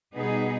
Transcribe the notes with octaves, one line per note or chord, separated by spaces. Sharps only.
B2 G3 B3 D#4 G#4